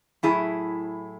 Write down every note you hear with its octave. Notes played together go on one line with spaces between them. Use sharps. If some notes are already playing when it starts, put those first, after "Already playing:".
A2 F#3 E4 G#4